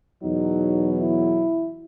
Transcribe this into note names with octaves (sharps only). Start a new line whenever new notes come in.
E2 B2 F#3 D#4
E4